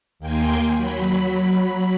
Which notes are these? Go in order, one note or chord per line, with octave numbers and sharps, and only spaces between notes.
D#2 A#3 G5 G#5 C6
F#3 B5